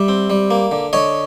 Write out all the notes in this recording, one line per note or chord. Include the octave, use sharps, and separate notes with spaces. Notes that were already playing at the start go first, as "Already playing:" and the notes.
Already playing: G3 D5 E5
C4
G3
A#3
D3
D3 C#5 D#5